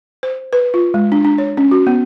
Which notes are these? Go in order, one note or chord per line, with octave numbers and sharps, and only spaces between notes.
C5
B4
F4
G#3
D4
D4
C#5
C#4
F#4
B3